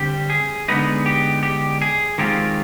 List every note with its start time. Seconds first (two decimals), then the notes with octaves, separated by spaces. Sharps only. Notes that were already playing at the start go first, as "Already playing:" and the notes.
Already playing: D3 G3 C4 G4
0.30 G#4
0.68 D3 G#3 B3 D#4 B4
1.06 G4
1.43 G4
1.82 G#4
2.18 D#3 G#3 C4 F4 G4